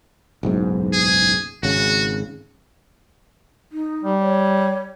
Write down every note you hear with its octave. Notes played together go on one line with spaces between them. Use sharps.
F#1 B1 G#2
G#4
G#1 C#3 F#4
D#4
G3
C#5